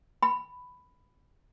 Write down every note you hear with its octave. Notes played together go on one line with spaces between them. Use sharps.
B5